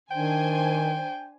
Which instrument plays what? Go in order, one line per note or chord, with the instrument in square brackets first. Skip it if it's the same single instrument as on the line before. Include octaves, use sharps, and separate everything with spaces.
[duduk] D#3 [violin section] D4 C5 G#5 [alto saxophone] G5